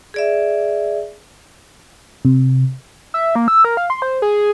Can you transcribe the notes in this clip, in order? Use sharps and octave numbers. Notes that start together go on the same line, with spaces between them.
G#4 D5 E5
C3
E5
A#3
E6
A#4
F5
C6
C5
G#4